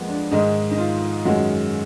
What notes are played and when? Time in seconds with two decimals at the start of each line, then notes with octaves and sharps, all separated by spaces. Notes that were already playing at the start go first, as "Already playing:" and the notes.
Already playing: F2 F3 G#3 A#3 B3
0.09 D4
0.31 G#2 D#3 G#3 D#4
0.71 D#4
0.78 F4
1.25 F#2 D#3 G#3 F#4